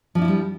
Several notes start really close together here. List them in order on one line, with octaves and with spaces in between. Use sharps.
F3 D4 E4 F4 G3